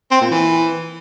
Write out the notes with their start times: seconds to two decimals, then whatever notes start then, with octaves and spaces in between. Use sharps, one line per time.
0.11 C4
0.21 A#2
0.31 E3